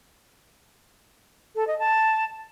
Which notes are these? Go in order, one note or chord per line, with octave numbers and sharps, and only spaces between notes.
A4
D#5
A5